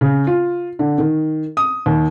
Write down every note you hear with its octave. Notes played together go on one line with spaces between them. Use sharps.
C#3
F4
D3
D#3
D#6
D#2